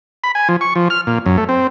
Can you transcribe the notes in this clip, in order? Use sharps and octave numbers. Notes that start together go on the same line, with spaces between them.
B5
G#5
F3
C#6
F3
F6
A#2
F#2
A3
C4